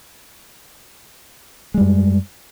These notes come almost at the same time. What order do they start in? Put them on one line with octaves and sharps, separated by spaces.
G#3 G3 F#2